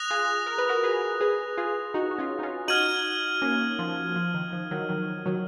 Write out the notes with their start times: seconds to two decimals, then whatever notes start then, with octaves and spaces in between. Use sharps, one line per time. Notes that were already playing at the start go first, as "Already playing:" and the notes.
Already playing: D#6 F#6 A#6 F7
0.10 F4 G#4
0.46 A#4
0.58 B4
0.69 F#4 A#4
0.84 G#4 B4
1.21 G#4 B4
1.58 F4 G#4
1.94 D#4 F#4
2.11 F#4
2.18 C#4 F4
2.39 D#4
2.43 C#4 F4
2.68 D#4 F#4 F6 G#6 D#7 F#7
3.42 A#3 C#4
3.79 F3
4.16 F3
4.34 D#3
4.53 F3
4.71 D#3 F#3
4.89 D#3 F#3
5.26 D#3 F#3